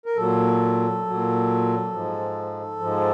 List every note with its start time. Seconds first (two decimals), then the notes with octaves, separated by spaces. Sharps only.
0.06 A#4
0.17 A#2 F#3 A4
1.05 A#2 F#3
1.92 G#2 F3
2.80 G#2 F3